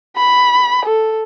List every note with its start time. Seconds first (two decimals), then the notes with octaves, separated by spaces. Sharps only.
0.17 B5
0.86 A4